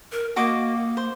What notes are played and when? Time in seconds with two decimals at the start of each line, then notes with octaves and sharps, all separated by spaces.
0.12 A#4
0.36 A#3 F#4 D#5 D6
0.97 C5